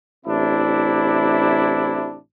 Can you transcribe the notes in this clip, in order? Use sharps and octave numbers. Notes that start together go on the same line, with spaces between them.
A1 C3 D4 E4